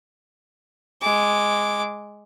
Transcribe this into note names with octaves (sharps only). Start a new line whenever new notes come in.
G#3 D6